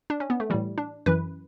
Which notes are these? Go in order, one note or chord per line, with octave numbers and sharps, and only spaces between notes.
D4
C#4
B3
A3
A2 E3 G3
D4
F#2 E3 B4